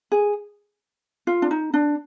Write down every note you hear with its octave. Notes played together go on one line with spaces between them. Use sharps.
G#4
F4
D4
D#4
D4